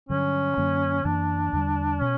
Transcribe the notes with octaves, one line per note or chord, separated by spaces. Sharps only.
G2 D3 F#3 C#4
F#2 D3 F#3 A#3
F#2 E3 A#3 D4
E2 D3 G3
B2 C#4